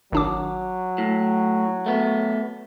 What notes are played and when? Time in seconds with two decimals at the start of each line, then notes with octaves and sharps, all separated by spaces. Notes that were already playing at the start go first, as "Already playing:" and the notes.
0.12 G#1 F#3 D4 D6
0.98 A2
1.86 A3 B3